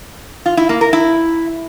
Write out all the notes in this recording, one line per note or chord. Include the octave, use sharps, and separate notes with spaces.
F4
E4
A#3
A#4
E4